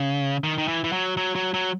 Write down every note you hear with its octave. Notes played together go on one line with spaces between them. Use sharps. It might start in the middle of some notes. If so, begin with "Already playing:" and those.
Already playing: C#3
D#3
D#3
E3
E3
F#3
F#3
F#3
F#3